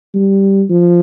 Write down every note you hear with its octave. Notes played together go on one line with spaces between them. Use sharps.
G3
F3